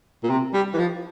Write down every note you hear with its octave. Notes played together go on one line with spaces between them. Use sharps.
A#2
C3
G3
E3
F3